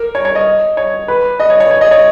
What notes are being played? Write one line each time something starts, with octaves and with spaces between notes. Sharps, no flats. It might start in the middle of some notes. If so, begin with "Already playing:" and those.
Already playing: A#4
C#5
C#5
D#5
C#5
B4
D#5
C#5
C#5
C#5
D#5
C#5